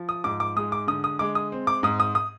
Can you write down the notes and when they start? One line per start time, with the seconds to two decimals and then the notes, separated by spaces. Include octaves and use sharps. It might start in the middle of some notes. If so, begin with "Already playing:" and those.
Already playing: F3
0.09 D#6
0.24 G#2 D6
0.40 D6
0.56 G#3 D#6
0.72 D6
0.87 D3 D#6
1.04 D#6
1.19 G#3 D6
1.35 D#6
1.52 C4
1.67 D6
1.83 G#2 D#6
2.00 D#6
2.15 D#6